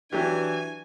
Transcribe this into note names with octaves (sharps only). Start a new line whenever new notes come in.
E3 F#3 D4 G4 G#5